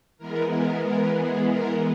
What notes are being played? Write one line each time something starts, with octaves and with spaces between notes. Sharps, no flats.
E3 G#3 B3 A#4
A#4
A#4
G#4
A#4